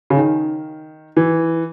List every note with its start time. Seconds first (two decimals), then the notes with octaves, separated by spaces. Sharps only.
0.10 C#3
0.17 D#3
1.17 E3